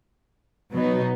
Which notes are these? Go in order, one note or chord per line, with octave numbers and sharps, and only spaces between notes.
B2 F#3 B3 D#4